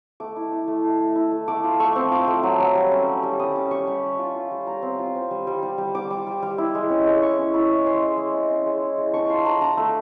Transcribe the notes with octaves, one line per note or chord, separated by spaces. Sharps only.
A3 D6
E4
E4
A3
A3
A3
E4
A3
A3 D6
F4
A3 C#6
C4
F4 D6
A3
F#3
F#3
G3
C#4
G3
G3
G3 D#6
C#4 D6
G3 C#6
G3 B5
G3
F4
F4
G3
G3 A#5
C4
F4
C4
G3
G3
G3
G3
G3 D6
G3
G3
G3
E4
G#3
C#4
G#3
E4 C#6
C#4
E4 B5
G#3
C#4 C6
G#3
G#3
C#4
C#4
G#3
E4
G#3
D4 C#6
F4 C6
D4 A#5
D4 A#5
A3 B5